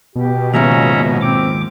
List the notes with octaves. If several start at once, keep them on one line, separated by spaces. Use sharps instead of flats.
B2 G4
D#2 G#2 C#3 F3 C#4 E5 A#5
C4 D6